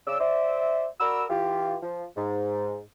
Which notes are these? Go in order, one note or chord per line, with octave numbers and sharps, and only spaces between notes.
C#3 D5 E6
C5 D5 E5
F#4 A#4 D5 B5 E6
E3 F4 G4
F3
G#2